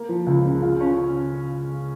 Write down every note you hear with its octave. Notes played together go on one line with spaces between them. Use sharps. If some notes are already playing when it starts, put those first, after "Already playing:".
Already playing: A#3
F3
C#2
C#3
F4
C#4